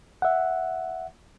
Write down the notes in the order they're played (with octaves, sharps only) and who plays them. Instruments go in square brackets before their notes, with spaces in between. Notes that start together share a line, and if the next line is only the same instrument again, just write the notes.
[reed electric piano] E5 F#5